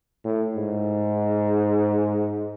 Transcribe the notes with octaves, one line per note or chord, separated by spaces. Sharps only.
A2
G#2